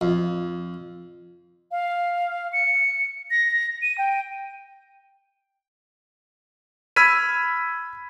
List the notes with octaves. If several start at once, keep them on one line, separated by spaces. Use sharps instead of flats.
F2
F5
C#7
A#6
D#7
G5
B5 E6 F6 G#6 B6 D#7